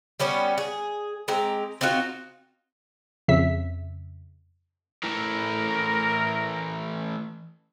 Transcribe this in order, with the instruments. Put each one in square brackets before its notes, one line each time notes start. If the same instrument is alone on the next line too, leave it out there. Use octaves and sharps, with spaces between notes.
[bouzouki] G3 B3 C#4 G4
G#4
G#3 C4 G4 A#5
C4 D#4 F4 F#4
[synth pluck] F2 C#3 E5 B6
[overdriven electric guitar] E3 A3 [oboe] A#4